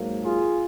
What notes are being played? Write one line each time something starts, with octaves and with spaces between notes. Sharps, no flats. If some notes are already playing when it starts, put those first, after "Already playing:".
Already playing: G#2 F#3 A#3
F4 G#4